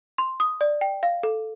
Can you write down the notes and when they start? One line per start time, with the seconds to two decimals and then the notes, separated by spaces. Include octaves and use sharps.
0.18 C6
0.40 D#6
0.61 D5
0.81 G5
1.03 F5
1.23 A4